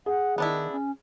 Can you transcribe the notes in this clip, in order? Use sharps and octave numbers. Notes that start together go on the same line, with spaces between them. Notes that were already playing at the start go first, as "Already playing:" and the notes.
G#4 F#5
D#3 B3 D4 E4
C#4